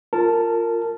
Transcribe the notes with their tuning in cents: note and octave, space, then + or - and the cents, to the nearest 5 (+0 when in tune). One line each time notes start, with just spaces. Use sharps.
F4 +0 A#4 -20 A5 +0